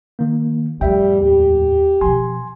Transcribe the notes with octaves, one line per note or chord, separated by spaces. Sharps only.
D#3 A#3
F2 A2 G3 E5 G5
D#2 G4
B2 F3 G#5 C6